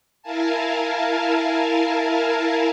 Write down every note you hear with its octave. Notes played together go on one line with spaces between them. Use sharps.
E4 A#4 F5 G#5 A5